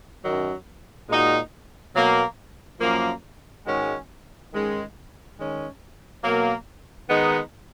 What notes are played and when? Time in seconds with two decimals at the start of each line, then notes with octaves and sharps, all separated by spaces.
0.23 F#2 D#3 F#3
1.08 A#2 G#3 D#4 F#4
1.94 B2 F#3 A#3
2.80 F#2 F3 A#3
3.65 G#2 D#3 G#3 C#4 F#4
4.52 G#2 D#3 G#3 C#4
5.37 D#3 G#3 C#4
6.23 B2 F#3 A#3
7.09 D#3 G#3 B3 D#4